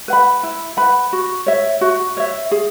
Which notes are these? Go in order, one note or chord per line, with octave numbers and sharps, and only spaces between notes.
B4 F#5 B5
E4
B4 F#5 B5
F#4
C#5 E5
F#4
C#5 E5
G#4